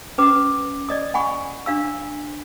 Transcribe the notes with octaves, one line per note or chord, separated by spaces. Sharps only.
C#4 B4 D6
D5 D#5 D#6
F#5 G#5 B5 C#6
D4 F5 E6